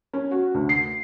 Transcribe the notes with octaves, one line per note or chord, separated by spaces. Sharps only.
C#4
F#4
D2
C7